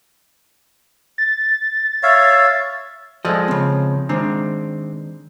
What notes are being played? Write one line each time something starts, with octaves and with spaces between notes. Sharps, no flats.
A6
C#5 E5 F5
F3 G#3 A4 D5 D#5
C#3 C4
D#3 G#3 C4 D4